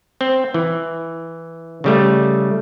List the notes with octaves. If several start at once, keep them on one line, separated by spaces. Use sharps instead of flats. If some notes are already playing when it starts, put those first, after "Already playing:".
C4
E3
C#3 G3 A3